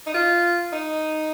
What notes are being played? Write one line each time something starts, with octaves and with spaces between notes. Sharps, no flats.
D#4
F4
D#4